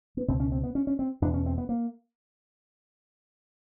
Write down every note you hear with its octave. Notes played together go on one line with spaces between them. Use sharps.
B3
C#2 B2 C4
C#4
C4
B3
C#4
C#4
C4
E2 B2 D4
C#4
C4
B3
A#3